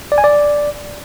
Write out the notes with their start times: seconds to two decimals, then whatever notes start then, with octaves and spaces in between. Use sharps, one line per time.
0.12 D5
0.18 G#5
0.24 D5